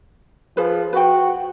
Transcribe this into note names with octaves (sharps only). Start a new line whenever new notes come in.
F3 G#4 B4
F#4 B4 G5